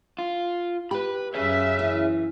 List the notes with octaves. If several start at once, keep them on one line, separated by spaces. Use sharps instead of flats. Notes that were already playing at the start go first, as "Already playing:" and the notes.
F4
G4 B4 B5
F#2 G#4 C#5 E5
E3